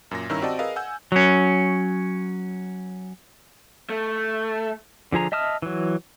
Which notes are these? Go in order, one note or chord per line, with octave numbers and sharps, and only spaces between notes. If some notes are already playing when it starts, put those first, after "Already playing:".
F#2 A#2 A#6
G2 D#3 C#4 E4 A#5 E6
C4 F#4 G4 D5 D#5 A5
G#4 A#4 B4 D#5 F5
F#5 G#5 E6 G6
F#3 C#4
A3
D3 F3 G#4 A#5
D#5 E5 A5 D#6 F6
E3 F#3